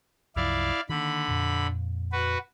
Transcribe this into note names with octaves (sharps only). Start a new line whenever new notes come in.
C2 F#2 F3 E4 D5 F5
D3 D#3 A#3 B5
F2 A#2
F#4 B4